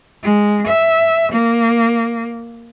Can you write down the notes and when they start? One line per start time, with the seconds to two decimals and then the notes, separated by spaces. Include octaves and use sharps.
0.23 G#3
0.67 E5
1.32 A#3